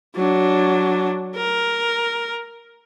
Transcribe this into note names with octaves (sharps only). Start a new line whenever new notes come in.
F#3 D4
A#4